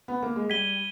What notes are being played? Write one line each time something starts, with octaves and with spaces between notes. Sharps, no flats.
B3
A#3
G#3
G3 G#6 B6 D#7 G7